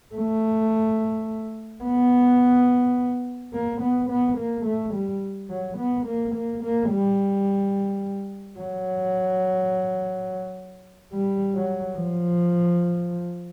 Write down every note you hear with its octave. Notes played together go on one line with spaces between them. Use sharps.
A3
B3
A#3
B3
B3
A#3
A3
G3
F#3
B3
A#3
A#3
A#3
G3
F#3
G3
F#3
F3